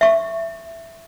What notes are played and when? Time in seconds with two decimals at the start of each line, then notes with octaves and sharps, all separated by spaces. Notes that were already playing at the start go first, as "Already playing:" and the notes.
0.01 E5 C#6